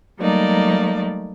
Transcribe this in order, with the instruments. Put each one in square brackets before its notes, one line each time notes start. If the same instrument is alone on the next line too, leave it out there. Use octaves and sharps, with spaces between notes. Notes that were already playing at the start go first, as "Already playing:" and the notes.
[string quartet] F#3 G3 A3 A#3 D#4 D5